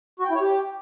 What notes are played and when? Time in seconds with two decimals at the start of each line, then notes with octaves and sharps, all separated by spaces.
0.20 F#4
0.25 G5
0.30 E4
0.35 C#5
0.41 G4